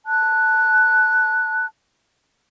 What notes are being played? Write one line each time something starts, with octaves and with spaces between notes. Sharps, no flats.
A5 F#6